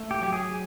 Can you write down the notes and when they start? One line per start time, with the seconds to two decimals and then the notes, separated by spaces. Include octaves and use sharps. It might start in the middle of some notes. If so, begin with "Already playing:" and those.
Already playing: A3
0.11 G4
0.21 F#3 G4
0.33 G#4